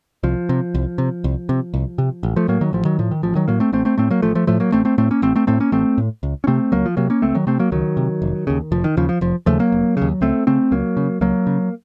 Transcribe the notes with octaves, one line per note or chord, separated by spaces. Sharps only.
C2 F3
C3
C2
C3
C2
C3
C2
C3
A1
F3 A3
A2 F#3 A#3
D#3 F#3
A1 F3
D#3 F#3
A2 F3
D#3
A1 F3
D#3 F#3
A2 F#3 A#3
A3 C4
A1 A3 C4
A3 C4
A2 A3 C4
F#3 A#3
A1 F3 A3
F3 A3
A2 F3 A3
F#3 A#3
A1 A3 C4
A3 C4
A2 A3 C4
A#3 C#4
A1 A3 C4
A3 C4
A2 A3 C4
A#3 C#4
A1 A3 C4
A2
C#2
C#4
C3 A3 C4
C#2 F#3 A#3
F3
C3 F#3 A#3
A#3 C#4
C#2 A3 C4
D#3 F#3
C3 A3 C4
F#3 A#3
C#2 D#3 F#3
C3
F1
D#2 C#3
F1 F3
D#3
D#2 C#3 F3
F3
F1 F3
D#2 C#3 F3 A3
F#3 A#3
F1
D#2 C#3
C#2 A3 C4
C#3 A3 C4
C#2 F#3 A#3
C#3
C#2 F#3 A#3
C#3